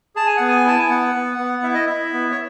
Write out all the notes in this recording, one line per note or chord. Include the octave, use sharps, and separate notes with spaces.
G#4 A5
G#5
B3 F#5
G#5
E4 A5
G#5
B3 F#5
B3
B3
E4 E5
D#5
E4 E5
B3
C#5